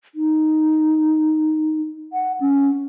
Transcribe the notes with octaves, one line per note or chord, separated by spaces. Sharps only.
D#4
F#5
C#4